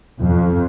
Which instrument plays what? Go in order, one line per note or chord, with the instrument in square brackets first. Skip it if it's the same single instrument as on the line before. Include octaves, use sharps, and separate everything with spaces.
[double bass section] F2